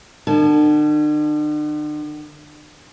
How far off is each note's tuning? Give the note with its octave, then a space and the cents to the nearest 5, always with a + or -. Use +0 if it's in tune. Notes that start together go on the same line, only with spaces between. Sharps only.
D3 +45 A5 -15